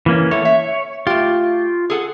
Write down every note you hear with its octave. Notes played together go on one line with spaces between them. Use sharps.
E3 A#3 C#4
A3 B3 A4 C#5
E5
A3 F4 G4
G#4 A4 F#5